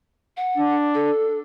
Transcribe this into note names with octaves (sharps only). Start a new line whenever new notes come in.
F#5
D4
A4